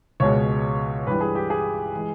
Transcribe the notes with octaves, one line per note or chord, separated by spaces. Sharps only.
C#2 B2 G#3 C#5
G2 E3 G3 B4
G#4
G4
G#4
E3 G#3